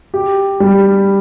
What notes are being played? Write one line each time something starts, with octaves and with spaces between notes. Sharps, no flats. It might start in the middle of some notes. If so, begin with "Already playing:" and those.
G4
G3